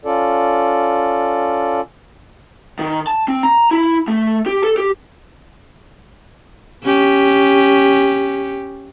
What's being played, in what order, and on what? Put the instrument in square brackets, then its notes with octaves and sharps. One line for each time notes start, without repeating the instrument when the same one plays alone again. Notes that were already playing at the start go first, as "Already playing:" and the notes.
[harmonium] C#4 F4 A4 D5
[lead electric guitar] D#3
A5
C4
A#5
E4
A3
G4
A4
G4
[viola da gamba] C#4 G4